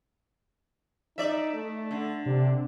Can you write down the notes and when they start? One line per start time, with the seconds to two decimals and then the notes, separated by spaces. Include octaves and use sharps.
1.18 D#4 D5 E5
1.54 A3
1.91 D3
2.26 C3 D4